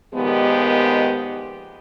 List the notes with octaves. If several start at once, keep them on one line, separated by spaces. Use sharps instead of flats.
A#2 D#3 F3 G#3 B3 G4